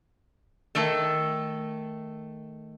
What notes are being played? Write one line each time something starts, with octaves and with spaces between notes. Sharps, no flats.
D#3 A3 A4